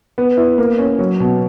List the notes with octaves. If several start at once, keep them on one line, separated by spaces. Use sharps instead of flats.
B3
E4
A#3
C#4
F#3
B2